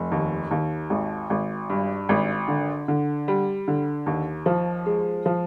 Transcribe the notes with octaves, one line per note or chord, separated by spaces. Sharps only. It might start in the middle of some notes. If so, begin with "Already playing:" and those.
Already playing: F1
D#2
D#2
G#1
G#1
G2
G#1
D3
D3
G3
D3
D#2
F3
G#3
F3